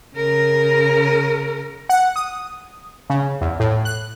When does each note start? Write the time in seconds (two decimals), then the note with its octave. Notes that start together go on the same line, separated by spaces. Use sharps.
0.16 C#3 A#4
1.89 F#5
2.16 D#6
3.10 C#3
3.41 E2
3.60 A2
3.85 F#6